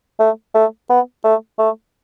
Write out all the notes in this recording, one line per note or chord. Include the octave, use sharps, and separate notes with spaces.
A3
A3
B3
A3
A3